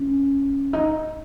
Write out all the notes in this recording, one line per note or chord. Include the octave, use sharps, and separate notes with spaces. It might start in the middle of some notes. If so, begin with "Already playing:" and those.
Already playing: C#4
D#4